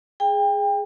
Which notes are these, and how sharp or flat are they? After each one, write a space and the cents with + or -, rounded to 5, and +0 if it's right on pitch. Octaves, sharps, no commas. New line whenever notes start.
G#4 +0 G5 +30